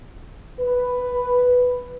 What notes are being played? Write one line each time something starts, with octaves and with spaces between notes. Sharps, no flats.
B4